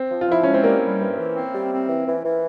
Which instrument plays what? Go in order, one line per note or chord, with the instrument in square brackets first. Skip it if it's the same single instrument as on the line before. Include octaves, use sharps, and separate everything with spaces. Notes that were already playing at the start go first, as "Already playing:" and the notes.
Already playing: [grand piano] C4
[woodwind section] F3
[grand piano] F4
[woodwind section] F3 [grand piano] E4
[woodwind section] G#3 [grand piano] C#4
[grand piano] C4
[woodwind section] G3 [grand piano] A#3
[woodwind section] G3
G2
E3
C4
G3
C4
E3
E3
E3